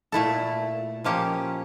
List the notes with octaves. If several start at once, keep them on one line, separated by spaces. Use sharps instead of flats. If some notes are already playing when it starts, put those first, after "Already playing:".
A#2 A3 E4 A4
F3 A#3 C#4 G4